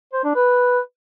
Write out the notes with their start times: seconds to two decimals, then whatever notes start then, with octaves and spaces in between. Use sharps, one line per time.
0.13 C5
0.24 D4
0.35 B4